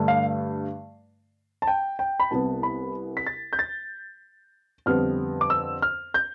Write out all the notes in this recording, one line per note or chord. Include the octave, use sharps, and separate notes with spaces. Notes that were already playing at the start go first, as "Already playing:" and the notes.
Already playing: G2 D3 A3
F5
A5
G5
G5
B5
C2 C3 G3 B3 A5
B5
B6
A6
G6
A6
F2 D3 G3 B3 F6
D6
E6
F6
G6